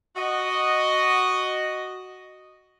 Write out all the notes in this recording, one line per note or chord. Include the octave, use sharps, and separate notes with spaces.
F#4 D#5